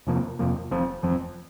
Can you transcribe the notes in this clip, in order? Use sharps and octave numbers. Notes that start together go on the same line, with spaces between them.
F2 C3 F3 A#3
F2 C3 F3 A#3
F1 F2 F3 C4
F1 F2 F3 C4